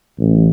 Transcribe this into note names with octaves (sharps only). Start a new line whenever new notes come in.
A1